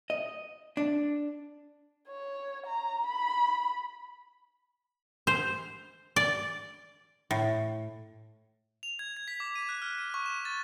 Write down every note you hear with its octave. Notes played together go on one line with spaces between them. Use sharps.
D#5
D4
C#5
A#5
B5
C5
D5
A2
F7
G#6
G#6
B6
D6
D#7
F#6
F6
D#7
C#6
E7
A6